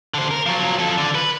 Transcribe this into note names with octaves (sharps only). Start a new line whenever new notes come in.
D3 C5
A#4
F3 F#3
F3 A4
D3
B4